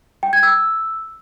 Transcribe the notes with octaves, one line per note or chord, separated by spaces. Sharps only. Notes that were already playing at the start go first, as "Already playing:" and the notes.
G5
G#6
E6